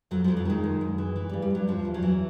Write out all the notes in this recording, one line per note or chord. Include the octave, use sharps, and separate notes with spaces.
F2 F#3
F2 F3
F#3
D#3 G#3
F#2
F#2
E3
E3
G3
G2
G3
G2 F#3
E2 F3
E2
F#3
E3